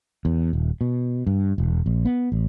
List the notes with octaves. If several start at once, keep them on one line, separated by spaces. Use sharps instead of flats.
E2
D#1
B2
G2
E1
A#1
B3
A1